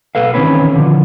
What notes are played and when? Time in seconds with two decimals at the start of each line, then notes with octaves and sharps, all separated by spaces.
0.15 B1 A4 B4 F5
0.34 D#3 E3 A#3 C4 C#4 B4
0.76 D3 F3